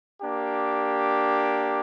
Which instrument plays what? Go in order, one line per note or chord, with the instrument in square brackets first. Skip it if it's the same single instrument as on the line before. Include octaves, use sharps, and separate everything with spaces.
[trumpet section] A#3 D4 G4